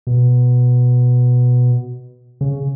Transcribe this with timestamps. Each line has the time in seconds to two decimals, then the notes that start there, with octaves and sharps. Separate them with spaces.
0.07 B2
2.41 C#3